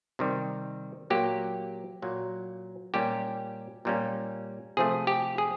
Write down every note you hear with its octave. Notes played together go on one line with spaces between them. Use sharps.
C3 D#3 G3
A#2 F#3 A#3 G4
A#2 F#3 A#3
A#2 G3 A#3 C#4 G4
A#2 G3 A#3 C#4
C3 F3 A3 G#4
G4
G#4